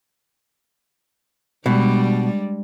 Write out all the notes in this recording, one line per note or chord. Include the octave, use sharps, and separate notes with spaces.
B2 G3 G#3 D4